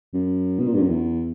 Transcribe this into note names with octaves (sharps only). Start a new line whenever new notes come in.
F#2
B2
A#2
G2
F#2
E2